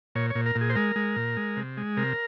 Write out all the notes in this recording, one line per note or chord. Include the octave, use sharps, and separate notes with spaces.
A#2 C#5
C#5
A#2
A#4
A#2
G#4
C5
G#3 A#4
G#3
A#2
G#3
C3
G#3
C3 A#4